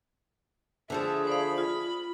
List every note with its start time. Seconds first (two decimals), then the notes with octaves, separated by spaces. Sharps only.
0.90 D3 F3 A3 G#4 E5
1.27 C5 D5 F5 B5
1.58 F4